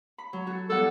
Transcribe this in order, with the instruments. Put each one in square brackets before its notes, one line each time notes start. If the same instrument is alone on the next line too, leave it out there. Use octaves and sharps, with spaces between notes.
[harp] B5
F#3
F#4 A4
[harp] E2 G3 F#5 [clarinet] A4